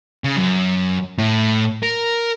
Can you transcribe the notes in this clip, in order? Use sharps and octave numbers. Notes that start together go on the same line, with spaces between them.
C#3
F#2
A2
A#4